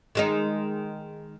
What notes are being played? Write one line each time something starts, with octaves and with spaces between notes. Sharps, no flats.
D#3 G#3 D#4